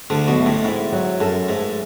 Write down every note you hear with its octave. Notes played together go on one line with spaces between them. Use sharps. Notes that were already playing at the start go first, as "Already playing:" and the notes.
D2 D3 A4
B1 B2
A3
A1 A2
G#2 E4
F#3
F#2 A4
G#2 A3